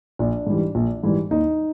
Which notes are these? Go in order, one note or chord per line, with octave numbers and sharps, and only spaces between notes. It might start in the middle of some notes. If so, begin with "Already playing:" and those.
A#1 D4
G#2 E3 G3
A#1
G#2 E3 G3
D#2 D#4